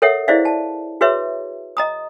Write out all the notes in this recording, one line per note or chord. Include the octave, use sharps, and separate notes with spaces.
A4 A#4 C#5 E5 F#5
E4 G#4 C5 D5 E5 F5
A5
F#4 G#4 B4 C#5 E5
D#5 A#5 D#6